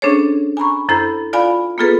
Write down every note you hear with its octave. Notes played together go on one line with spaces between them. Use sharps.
C#4 D4 G#4 A4 C5 C#5
G#5 A#5 B5 C#6
F#2 E4 A4 C5 B5 G6
F4 D5 F5 G#5 B5
A#3 B3 F4 G#4 A4 B4